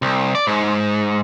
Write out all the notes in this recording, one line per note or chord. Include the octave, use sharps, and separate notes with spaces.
C2
D5
G#2